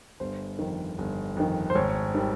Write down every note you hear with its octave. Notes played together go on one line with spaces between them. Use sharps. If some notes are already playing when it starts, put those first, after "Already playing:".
G1 C5
F2 D#3
G1
F2 D#3
C5
G#1 C#5
D#3 G3